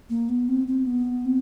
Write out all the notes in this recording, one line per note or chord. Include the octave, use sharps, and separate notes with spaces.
A#3
B3
C4
C4
B3
C4